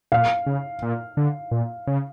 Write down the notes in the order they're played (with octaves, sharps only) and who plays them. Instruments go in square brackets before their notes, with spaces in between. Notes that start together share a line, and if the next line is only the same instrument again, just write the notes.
[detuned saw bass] A#2 [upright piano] F5
[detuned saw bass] C#3
A#2
D3
A#2
C#3